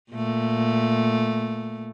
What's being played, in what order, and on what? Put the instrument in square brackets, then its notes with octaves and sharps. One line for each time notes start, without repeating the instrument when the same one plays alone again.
[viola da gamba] A#2 A3